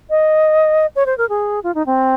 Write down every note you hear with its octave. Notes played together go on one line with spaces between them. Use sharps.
D#5
C#5
C5
A#4
G#4
F4
D#4
C4